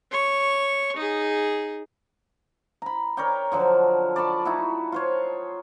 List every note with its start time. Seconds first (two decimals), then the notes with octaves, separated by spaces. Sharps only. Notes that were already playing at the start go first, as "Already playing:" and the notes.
0.11 C#5 C#6
0.97 D#4 G#4
2.82 A#5 B5
3.17 A#4 C#5 D5 G5
3.52 D3 F3 F#3
4.16 D5 A5 B5 C#6
4.45 D#4 E4 F#4
4.92 F4 C5 C#5